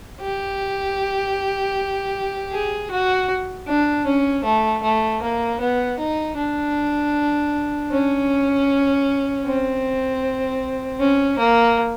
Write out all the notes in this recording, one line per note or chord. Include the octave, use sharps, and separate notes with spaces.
G4
G#4
F#4
D4
C#4
A3
A3
A#3
B3
D#4
D4
C#4
C4
C#4
A#3